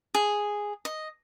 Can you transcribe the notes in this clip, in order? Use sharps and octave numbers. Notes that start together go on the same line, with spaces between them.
G#4
D#5